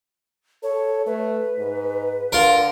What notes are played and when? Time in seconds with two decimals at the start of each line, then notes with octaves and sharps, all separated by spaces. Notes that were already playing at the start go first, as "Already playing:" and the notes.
0.63 A4 C#5
1.06 A3 B4
1.58 G#2
2.32 D3 F4 A#4